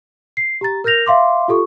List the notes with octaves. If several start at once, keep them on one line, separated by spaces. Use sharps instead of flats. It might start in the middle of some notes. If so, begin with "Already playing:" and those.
C7
G4 A#5 A6
A#4 F6 G6 A#6 F7
E5 F5 C6 D6
F4 G4 A4 C#6